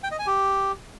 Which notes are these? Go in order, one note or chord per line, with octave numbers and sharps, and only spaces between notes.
G5
D#5
G#5
G4